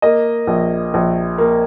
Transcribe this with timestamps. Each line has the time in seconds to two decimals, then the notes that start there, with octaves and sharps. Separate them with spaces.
0.02 A#3 D#5
0.47 A#1
0.94 A#1
1.38 A#3